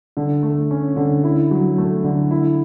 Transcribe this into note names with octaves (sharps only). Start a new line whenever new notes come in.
D3
A3
C#4
D3
E4
F#3
A3
D3
E4